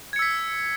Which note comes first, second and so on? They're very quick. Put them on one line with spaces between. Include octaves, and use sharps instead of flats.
G#6 C#7 E6 B6